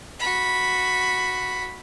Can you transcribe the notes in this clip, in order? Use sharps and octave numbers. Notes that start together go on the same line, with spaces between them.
F#4 B5